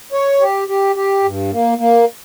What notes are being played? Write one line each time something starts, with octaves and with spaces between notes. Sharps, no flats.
C#5
G4
G4
G4
G2
A#3
A#3